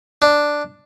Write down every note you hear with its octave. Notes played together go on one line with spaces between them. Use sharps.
D4